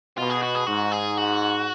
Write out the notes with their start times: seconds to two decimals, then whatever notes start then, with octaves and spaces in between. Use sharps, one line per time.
0.17 B2 F4
0.30 G#4
0.43 F#4
0.55 G#4
0.67 G#2 F#4
0.92 G#4
1.18 F#4